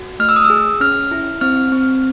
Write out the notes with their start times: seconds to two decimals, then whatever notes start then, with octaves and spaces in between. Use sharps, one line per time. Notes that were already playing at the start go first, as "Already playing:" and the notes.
Already playing: F#4
0.19 A3 F6
0.29 E6
0.36 D#6
0.45 E6
0.50 G#4
0.80 C#4 F6
1.11 E4
1.41 C4 F6
1.72 C4